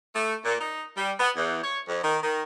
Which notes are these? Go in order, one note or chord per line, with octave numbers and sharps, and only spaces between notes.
A3
A#2
D#4
G3
B3
E2
C#5
F2
D#3
D#3